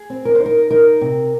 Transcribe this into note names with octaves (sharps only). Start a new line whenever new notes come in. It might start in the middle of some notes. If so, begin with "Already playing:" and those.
Already playing: G#4
C4
A#4
D#4 C5
A#4
D#4 A#4
C3